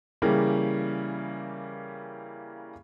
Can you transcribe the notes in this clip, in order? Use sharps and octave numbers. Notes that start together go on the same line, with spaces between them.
C#3 E3 G3 A#3